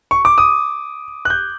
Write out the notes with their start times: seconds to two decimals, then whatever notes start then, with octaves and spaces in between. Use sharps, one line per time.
0.11 C#6
0.25 D6
0.38 D#6
1.25 F#6
1.30 G6